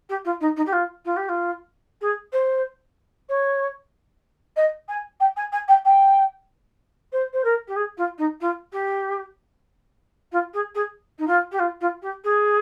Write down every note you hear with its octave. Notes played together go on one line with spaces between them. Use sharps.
G4
F4
D#4
D#4
G4
F4
F4
G4
F4
G#4
C5
C#5
D#5
G#5
G5
G#5
G#5
G5
G5
C5
C5
A#4
G4
G#4
F4
D#4
F4
G4
F4
G#4
G#4
D#4
F4
G4
F4
F4
G4
G#4